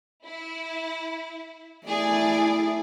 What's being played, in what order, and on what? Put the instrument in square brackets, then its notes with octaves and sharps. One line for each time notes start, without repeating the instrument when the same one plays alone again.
[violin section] E4
[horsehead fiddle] A3 E4 [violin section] G#4 D5